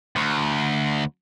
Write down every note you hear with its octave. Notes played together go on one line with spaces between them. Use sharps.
D2